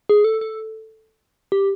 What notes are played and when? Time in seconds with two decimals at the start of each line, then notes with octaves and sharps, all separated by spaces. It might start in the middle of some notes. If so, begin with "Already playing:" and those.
0.09 G#4
0.24 A4
0.41 A4
1.52 G4